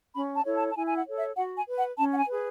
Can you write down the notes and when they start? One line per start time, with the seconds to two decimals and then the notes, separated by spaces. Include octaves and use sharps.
0.15 C#4 B5
0.35 A5
0.46 E4 A4 C#5
0.56 A5
0.70 A5
0.76 E4 G#5
0.87 G#5
0.96 F#5
1.07 A4 C#5
1.16 E5
1.37 F#4 F#5
1.57 G#5
1.67 B4
1.77 F#5
1.98 C#4 A5
2.12 F#5
2.19 G#5
2.28 G#4 B4